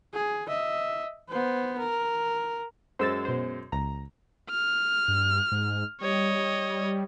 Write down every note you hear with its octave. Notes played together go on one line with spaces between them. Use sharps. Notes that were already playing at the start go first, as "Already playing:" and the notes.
G#4
D#5 E5
B3 C5
A#4
F#2 G#3 C5 E6 A6
B2 C5
C#2 A#5
F6
G2
G#2
G3 C#5 D#5